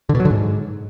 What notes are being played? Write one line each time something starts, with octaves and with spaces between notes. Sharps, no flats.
D3
B2
F#3
D3
G#2